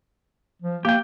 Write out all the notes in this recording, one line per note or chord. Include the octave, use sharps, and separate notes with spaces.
F3
A#3 G4 G5